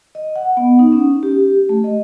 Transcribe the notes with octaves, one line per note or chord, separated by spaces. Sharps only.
D#5
F#5
B3
D#4
C#4
G4
A3
D#5